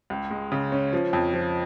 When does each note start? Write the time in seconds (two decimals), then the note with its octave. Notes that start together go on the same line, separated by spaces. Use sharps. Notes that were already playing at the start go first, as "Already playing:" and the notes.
0.10 C#2
0.31 G#3
0.52 C#3
0.72 C#4
0.93 F3
1.13 F2
1.33 F3